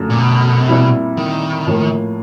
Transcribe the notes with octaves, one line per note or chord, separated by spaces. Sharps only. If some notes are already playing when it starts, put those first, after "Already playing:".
Already playing: F#2 D3 F3 A3
A#2
B2
A#2 G3 C4 E4
D#3
A2 F3 A#3